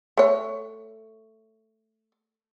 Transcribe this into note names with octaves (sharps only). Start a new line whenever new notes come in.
A3 C#5